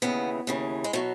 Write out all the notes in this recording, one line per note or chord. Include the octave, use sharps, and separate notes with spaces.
D#2 C#3 E3 B3
D#2 C#3 E3
G#3
B2 F#3 A3